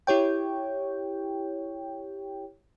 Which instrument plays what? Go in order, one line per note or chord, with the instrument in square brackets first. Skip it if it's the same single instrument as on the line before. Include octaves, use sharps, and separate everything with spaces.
[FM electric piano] E4 G4 C#5 G5